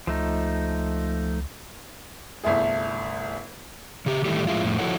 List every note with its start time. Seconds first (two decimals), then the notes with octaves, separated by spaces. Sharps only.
0.07 C#2 F3 A3 D#4
2.44 G1 C2 A3 E4 G#4
4.06 C#3 G4
4.25 A2 D#3 E3 G3 A3 G4
4.47 A2 F3 G#3 E4 F4
4.64 F2 A2
4.78 F3 E4 F#4 A4 C#5 F#5